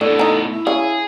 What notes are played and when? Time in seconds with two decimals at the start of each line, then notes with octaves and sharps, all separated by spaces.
0.01 A2 B3 D4 A4
0.19 D#4 A#5
0.52 E4
0.67 C#3 G#4